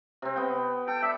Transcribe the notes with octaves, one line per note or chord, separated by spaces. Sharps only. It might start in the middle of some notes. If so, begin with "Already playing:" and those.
C3 C4
B3 G5
A4 G5
D5 E5